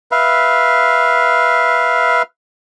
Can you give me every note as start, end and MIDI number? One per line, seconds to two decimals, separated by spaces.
0.12 2.22 71
0.12 2.22 76
0.12 2.22 77